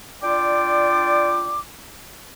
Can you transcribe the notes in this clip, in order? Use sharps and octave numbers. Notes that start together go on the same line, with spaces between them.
D4 F4 D5 G5 D6